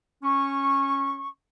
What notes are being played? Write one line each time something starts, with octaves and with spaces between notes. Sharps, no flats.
C#4 C#6